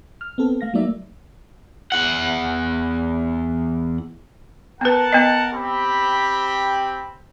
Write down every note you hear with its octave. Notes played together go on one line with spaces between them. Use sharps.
F6
B3 C4 A4
A3 F5 A#6
F#3 A3 A#3 D#4 D5 E5
E2 F#5
B3 A#4 B4 F#5 A5
B3 D#5
C4 G4 B5